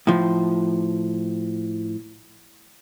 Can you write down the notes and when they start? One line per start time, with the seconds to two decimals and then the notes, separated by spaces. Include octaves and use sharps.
0.07 A2 F3